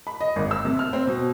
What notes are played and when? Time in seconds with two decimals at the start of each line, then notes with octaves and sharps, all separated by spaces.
0.07 B5
0.21 D#5
0.36 G#1
0.51 E6
0.65 C3
0.79 F6
0.93 C4
1.07 B2